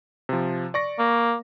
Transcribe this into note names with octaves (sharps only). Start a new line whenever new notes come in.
C3 F3
D5 C#6 A#6
A#3